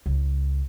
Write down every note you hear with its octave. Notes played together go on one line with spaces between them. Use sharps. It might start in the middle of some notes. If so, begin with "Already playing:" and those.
C#2